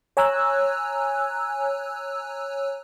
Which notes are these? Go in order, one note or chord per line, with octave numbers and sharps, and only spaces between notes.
C#5 G#5 A#5 E6 F#6